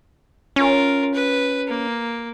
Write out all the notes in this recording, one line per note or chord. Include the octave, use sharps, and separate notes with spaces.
C#4 F4 A#4
B4
A#3